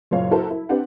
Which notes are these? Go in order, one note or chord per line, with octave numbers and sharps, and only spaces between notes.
F#1 A#2 A#3 C#5 F5
E4 F#4 A4 A#4 C5 A5
E4
C4 D4 G4 B4 F#5